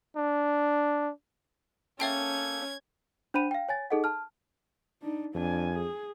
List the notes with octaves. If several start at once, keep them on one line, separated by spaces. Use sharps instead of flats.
D4
A#3 C#4 A4 E5 G5 A5 G6 G#6
D4 C5 F#5 B5 D#7
F5 G5
C#5 G#5 A6
D#4 G#4 A4 D#5 F#5
A5 F6
D4 D#4
F2 D4 G#5
G#4